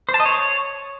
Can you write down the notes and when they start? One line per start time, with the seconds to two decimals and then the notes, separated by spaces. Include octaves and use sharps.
0.09 C5
0.14 A5
0.20 D#5
0.25 C#5